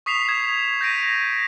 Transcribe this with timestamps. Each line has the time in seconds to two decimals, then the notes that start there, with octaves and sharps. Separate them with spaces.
0.06 C#6 D#6 B6 C7 E7 F7
0.28 D#6 G#6 E7
0.81 G6 A#6 B6 D7 D#7